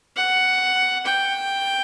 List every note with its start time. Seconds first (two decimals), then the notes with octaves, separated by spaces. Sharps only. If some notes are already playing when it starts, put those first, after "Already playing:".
0.16 F#5
1.06 G5